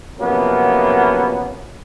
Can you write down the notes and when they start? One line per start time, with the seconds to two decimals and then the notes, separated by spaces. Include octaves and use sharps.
0.19 C3 F3 F#3 A#3 B3 C#4